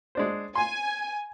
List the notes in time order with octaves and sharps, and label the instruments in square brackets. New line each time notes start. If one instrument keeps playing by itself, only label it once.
[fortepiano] G#3 D4 C5
[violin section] G#5 [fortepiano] C6